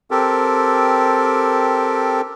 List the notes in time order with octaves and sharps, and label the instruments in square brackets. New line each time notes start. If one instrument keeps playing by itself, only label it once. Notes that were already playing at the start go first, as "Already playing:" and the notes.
[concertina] C4 G4 A4 A#4